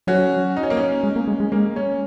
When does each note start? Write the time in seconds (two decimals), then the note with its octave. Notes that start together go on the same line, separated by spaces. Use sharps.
0.07 F#3 C#4 F#4
0.57 D#4
0.63 C#4
0.70 A#3
0.77 C#4
1.04 G#3
1.16 A#3
1.27 G#3
1.40 G#3
1.52 G#3 A#3
1.76 C#4